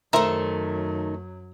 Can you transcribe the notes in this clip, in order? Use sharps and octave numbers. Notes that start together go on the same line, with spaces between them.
F#2 D#3 F#3 A3 C5 E5 A#5